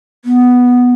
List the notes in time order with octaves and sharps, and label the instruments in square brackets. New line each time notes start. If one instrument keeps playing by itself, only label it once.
[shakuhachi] B3